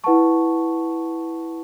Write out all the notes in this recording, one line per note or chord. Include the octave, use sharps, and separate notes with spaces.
E4 B4 F#5 A5 C#6